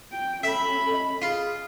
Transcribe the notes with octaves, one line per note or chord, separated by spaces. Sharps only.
G5
C#4 A4 E5 B5
D#5
F4 G#4